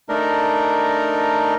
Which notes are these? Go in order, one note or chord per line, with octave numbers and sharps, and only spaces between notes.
A3 D4 D#4 A#4